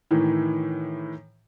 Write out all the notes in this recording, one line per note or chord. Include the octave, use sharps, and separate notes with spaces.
A2 D#3 E3